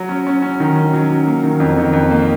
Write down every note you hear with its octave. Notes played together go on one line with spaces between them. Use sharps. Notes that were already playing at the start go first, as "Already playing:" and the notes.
Already playing: F#3
C#4
C#4
C#4
D#3
C#4
F#3
C#4
A#3
D#3
F2
D#3
F2
A#3